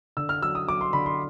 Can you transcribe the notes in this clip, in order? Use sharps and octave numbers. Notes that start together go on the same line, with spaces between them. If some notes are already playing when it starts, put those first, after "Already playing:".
D3 E6
F6
F#3 E6
D#6
F#3 D6
C6
D3 B5
C6